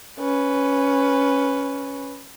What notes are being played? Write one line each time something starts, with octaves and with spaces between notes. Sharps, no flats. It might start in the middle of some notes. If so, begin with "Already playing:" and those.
C#4 B4